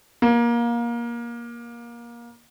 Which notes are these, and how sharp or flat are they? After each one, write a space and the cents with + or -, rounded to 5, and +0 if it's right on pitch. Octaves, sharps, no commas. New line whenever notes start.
A#3 +20